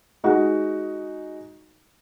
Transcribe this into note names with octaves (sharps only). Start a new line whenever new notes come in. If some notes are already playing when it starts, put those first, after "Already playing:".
G#3 D#4 F#4